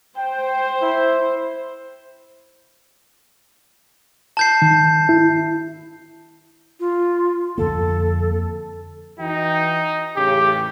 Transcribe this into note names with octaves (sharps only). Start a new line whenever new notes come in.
C5 G5
E4
A5 G6 C7
D#3
E4
F4
F2 D3 A#3 A4
E3 D#4 F#4 G5
A1 C#3 G4